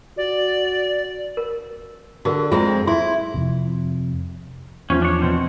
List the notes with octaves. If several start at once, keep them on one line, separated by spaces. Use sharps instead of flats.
F#4 D5
A#4
D3 F#4 G#4 A#4
F2 G#3 C4 F4 G#4 A#5
E4 C6
F2 C3
E2 F3 C#4
D4 C#5
B2 C4